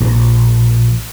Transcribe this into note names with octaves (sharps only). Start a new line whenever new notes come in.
A#1